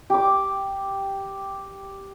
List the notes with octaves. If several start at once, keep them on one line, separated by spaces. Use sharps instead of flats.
G4 D6